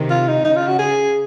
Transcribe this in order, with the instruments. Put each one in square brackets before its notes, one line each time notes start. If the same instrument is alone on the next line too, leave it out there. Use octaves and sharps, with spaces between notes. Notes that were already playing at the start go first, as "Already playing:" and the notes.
Already playing: [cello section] C3 D#3
[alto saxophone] F4
D#4
[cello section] C#3 [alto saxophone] D#4
[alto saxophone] F4
F#4
G#4